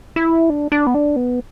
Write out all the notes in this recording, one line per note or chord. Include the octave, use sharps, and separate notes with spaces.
E4
D4
D4
B3
D4
B3